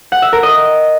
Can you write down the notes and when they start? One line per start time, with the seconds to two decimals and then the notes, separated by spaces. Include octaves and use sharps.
0.12 F#5
0.22 E5
0.33 A#4
0.43 D#5